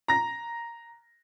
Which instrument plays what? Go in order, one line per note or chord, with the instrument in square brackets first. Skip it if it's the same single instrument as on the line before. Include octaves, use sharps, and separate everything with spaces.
[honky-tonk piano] A#5 A#6